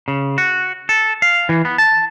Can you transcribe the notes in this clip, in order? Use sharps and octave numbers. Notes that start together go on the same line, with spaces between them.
C#3
F#4
A4
F5
E3
B3
A5